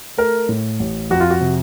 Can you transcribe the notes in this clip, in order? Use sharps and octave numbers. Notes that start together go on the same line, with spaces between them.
A3 A#4
A2
A1
F2 F#4
F4
F#4
C3